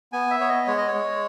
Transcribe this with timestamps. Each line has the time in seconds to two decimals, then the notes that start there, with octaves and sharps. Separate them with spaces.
0.13 B3 G#5
0.31 E5
0.40 B3 C#5
0.49 D#5
0.67 G#3 C#5
0.77 D#5
0.87 C#5
0.94 G#3